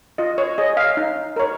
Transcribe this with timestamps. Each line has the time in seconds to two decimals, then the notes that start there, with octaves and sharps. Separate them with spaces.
0.18 F4 D#5
0.38 C#5
0.58 G#4 C#5 D#5
0.77 F5
0.97 D#4
1.36 A#4 C#5